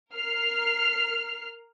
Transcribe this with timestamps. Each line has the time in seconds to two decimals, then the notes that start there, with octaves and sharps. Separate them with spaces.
0.13 A#4 F6 C7